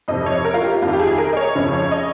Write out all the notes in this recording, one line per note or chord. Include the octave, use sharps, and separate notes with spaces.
F2 C3 F3 D#5
C#5
A#4
F4
G4
F2 D#3 F4
G4
G#4
A#4
D#5
C#5
F2 C#3 F3
C#5
D#5